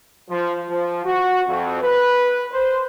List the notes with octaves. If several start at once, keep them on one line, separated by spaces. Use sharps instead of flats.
F3
F3
F#4
F2
B4
C5